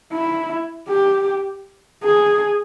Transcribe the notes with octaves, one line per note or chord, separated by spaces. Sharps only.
E4
G4
G#4